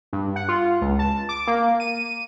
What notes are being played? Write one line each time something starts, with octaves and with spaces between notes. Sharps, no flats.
G2
F#5
F4
C#2
A5
D6
A#3
D#7